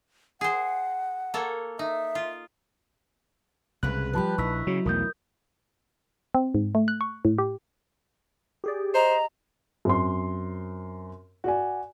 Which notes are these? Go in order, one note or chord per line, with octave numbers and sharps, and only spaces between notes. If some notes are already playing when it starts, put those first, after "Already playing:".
G#4 C5 F#5
A#3 A4 C#5
D#4 E5
F4
C2 C#3 G#3 B4 F#6
F3 G3 G4 B4 A5 B5
A#1 D#4 E4 C#6 E6 B6
C#3 F#3
B1 E2 A3 A#4 D#6 G6
C4
G#2
A3
F#6
C#6
A2
G4
G4 G#4 D5
C5 D#5 A#5
F#2 C4 C6
F#4 D5 G#5